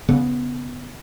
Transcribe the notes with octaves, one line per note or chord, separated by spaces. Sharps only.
C#3 B3